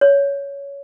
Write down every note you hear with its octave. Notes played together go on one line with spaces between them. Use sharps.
C#5